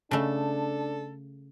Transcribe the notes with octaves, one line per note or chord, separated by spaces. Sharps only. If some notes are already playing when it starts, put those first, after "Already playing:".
C#3 A3 D4 A4